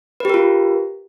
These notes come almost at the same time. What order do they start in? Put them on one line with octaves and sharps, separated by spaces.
B4 G4 A#4 F4